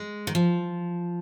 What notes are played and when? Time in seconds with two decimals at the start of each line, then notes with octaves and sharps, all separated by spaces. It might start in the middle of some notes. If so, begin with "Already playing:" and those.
Already playing: G#3
0.27 D#3
0.35 F3